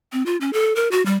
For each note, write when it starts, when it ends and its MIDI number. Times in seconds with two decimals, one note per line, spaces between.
0.12 0.25 60
0.26 0.37 65
0.41 0.52 61
0.53 0.73 69
0.76 0.90 70
0.91 1.04 66
1.06 1.17 55